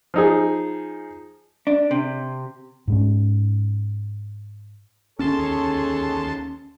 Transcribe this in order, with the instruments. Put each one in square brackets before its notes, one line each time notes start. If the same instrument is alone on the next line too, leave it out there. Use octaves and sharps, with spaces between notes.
[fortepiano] F3 D#4 G#4
[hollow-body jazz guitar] D4
C3
[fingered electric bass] G#2 G#3 C#4
[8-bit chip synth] D#2 A5 C6 [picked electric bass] C#4 [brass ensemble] G#4 A4 C#5